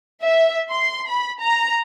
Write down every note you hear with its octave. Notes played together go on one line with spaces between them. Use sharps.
E5
C6
B5
A#5